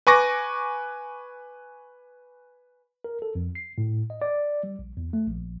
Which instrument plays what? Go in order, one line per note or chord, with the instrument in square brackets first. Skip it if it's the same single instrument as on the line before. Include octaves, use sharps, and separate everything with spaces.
[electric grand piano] B4 G#5 C#6 D6 A#6
[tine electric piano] A#4
A4
F2
C7
A2
D#5
D5
G3
A#1
E2
A3
A#1